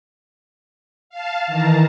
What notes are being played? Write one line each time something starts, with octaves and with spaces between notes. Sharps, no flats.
F5 A5
D#3 E3 A5 A#5